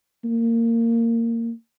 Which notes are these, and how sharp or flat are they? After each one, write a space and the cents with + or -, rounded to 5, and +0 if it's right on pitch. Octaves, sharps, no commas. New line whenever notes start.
A#3 -20